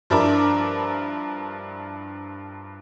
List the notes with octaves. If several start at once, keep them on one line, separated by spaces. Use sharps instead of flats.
G2 F3 D4 E4 A#4 D6